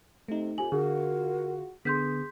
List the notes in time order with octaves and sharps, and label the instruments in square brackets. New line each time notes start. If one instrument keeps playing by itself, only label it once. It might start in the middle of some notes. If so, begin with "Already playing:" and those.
[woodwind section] C3 [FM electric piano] A3 D#4
[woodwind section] F2 [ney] G4 [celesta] G#5 F#7
[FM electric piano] D3 [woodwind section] F4 F#4 [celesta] G#4 [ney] A#4
[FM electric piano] D3 B3 [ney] G#4 [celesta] C6 G6 B6